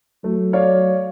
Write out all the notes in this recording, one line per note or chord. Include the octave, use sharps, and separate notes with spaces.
F#3 A3
C#5 D5 F5